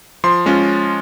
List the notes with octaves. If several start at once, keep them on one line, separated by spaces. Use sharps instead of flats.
F3 C6
G#3 C#4 F4